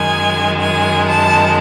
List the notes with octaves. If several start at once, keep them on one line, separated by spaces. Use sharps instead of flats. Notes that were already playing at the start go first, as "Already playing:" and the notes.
Already playing: F#2 D#3 G#3 G#5
G#5
A5